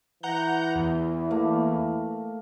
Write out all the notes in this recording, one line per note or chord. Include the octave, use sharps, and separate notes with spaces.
E3 F#5 A#5 G6
E2
A3 A#3